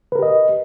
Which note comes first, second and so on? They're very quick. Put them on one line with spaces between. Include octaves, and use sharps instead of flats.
B4 A#4 G4 D#5